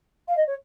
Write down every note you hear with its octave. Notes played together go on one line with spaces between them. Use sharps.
F5
D#5
C#5